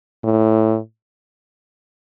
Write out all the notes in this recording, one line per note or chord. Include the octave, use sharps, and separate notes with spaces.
A2